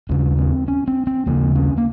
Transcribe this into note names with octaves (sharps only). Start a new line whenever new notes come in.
D#2 C#3 C#4
C4
C#4
C4
C4
D#2 C#3 A#3
C#4
A#3